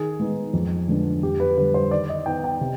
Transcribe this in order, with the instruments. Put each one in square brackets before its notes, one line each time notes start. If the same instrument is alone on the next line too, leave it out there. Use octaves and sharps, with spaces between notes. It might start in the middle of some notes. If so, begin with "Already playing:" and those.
Already playing: [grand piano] D#3 G#4
G#3 B3 D#4
F2
D3 G#3 B3 D4
F2 G4
B4
D3 G3 B4
C5
D#3 D5
D#5
B3 D#4 G5
G5
C3